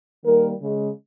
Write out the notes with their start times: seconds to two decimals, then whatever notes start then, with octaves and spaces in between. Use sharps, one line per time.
0.25 D#3 G3 A#3 A#4
0.61 C#3 G#3